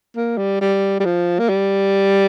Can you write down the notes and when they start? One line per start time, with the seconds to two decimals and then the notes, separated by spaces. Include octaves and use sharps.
0.16 A#3
0.38 G3
0.61 G3
1.00 G3
1.05 F3
1.39 A#3
1.49 G3